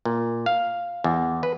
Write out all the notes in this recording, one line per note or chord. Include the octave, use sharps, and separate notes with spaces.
A#2
F5
E2
B4